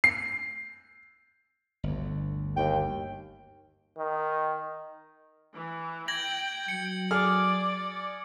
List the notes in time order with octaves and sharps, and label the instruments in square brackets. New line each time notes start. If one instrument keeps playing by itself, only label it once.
[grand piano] C7
[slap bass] G1 D2
[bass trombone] D#2 [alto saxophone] G5
[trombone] D#3
[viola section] E3
[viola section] G5 [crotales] G#6 A#6 F#7
[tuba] F#3 [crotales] C#7
[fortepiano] G#4 F6 [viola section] D5